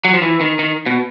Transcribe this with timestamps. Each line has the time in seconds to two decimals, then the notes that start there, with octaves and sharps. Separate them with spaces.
0.05 F#3
0.14 F3
0.22 E3
0.41 D#3
0.59 D#3
0.86 B2